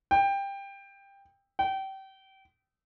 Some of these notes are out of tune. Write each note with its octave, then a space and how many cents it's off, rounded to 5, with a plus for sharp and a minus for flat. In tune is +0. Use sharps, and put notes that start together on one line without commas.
G5 +15
G5 -30